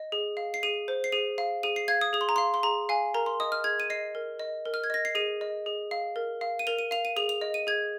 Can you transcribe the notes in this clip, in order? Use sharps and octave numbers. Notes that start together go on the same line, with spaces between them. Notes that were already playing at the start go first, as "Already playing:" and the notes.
Already playing: D#5
G#4
F5
C7
G#4 D#7
C5
C7
G#4 D#7
F5
G#4 D#7
C7
F5 G#6
D#6
G#4 D#6
C6
A#5
F5 C6
C6
G#4 A#5
F5 G#5
A#4 A#5
C6
D#5 D#6
F6
G#4 G#6
D#7
D#5 C7
A#4
D#5
A#4
F6
G#6
D#5 A#6
C7
G#4 D#7
D#5
G#4
F5
A#4
F5
D#7
A#4 F7
D#7
F5 F7
D#7
G#4 F7
F7
D#5
D#7
G#4 G#6